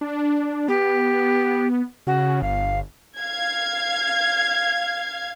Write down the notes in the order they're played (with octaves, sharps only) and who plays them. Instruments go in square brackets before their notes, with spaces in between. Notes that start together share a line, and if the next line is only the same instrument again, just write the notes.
[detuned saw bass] D4
[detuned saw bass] B3 [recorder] G4
[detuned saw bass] C#3 [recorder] F#4
[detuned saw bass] G1 [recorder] F5
[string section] F5 G#6